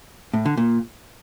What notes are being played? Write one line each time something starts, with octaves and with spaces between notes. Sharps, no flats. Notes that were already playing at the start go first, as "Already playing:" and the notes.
A2
D3
A#2